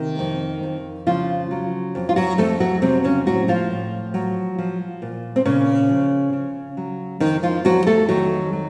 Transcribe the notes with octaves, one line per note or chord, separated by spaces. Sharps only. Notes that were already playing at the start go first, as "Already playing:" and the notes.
Already playing: C3 D#3 A#3
F2
F2
C#3 F3 F4
F#3
F2
F4
F#3 F#4
F2 A3 A4
F#3 F#4
C3 F#3 C4
C#3 C#4
A2 F#3 F#4
F3 F4
A2
F#3
F3
A#2
C4
A#2 C#3 C#4
F3
C#3
F#3
F2 D#3 D#4
F3 F4
F2 F#3 F#4
A3 A4
D#3 F#3 F#4
F#3